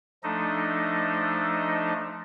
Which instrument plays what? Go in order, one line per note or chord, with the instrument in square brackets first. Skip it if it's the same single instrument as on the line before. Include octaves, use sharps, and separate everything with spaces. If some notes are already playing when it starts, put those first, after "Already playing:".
[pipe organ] F3 A3 D4 D#4 A4 D#5